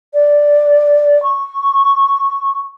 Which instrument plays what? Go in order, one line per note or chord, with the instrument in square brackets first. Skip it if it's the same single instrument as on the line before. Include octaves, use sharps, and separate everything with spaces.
[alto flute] D5
C#6